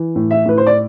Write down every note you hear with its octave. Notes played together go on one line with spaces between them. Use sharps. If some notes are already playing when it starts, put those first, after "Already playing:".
Already playing: E3
A2
E5
A2 B4
C5
D5